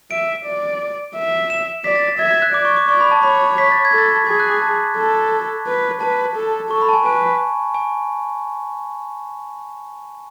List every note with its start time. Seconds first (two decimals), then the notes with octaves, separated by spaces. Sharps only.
0.11 E5 D7
0.46 D5
1.16 E5
1.50 E7
1.84 D5 B6
1.96 A6
2.07 A6
2.19 E5 G#6
2.31 G#6
2.42 F#6
2.53 D5 D6
2.65 C#6
2.76 D6
2.89 D5 C#6
3.01 B5
3.11 A5
3.23 C#5 B5
3.58 B6
3.72 A6
3.85 G#6
3.92 A4
3.98 A6
4.27 G#4 G#6
4.40 F#6
4.50 D6
4.62 A5
4.97 A4
5.67 B4
6.01 B4 A5
6.36 A4
6.71 A4 C#6
6.82 B5
6.89 A5
6.93 G#5
7.05 B4 G#5
7.74 G#5